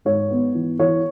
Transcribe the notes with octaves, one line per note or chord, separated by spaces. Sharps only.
G#2 C#5
B3
E3
E3 C#5